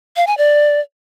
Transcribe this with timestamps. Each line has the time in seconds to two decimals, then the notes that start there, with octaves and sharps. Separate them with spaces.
0.16 F5
0.27 G#5
0.38 D5